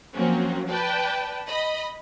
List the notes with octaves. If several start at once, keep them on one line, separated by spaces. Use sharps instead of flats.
F3 F#3 A#3 C4 C#4
B4 D5 G5 A5
D#5 B5